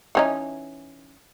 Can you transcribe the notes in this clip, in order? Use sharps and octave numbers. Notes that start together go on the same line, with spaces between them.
E3 C#4 D#4